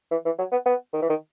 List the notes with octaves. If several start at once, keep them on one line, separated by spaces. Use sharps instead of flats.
E3
E3
F#3
B3
B3
D#3
E3
D#3